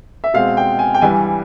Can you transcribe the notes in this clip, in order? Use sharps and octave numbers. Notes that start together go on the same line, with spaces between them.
E5
B2 G#3 C4 F5
G5
G#5
G5
G2 E3 G3 G#5